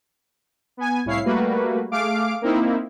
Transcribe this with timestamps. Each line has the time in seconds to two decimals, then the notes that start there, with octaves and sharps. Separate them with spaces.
0.77 B3 G#5
1.05 C2 A2 E4 C#5 F5 C7
1.25 G3 A3 A#3 F#4 B4
1.91 A3 G#4 F5 D6 D7
2.42 A#3 C4 D#4 E4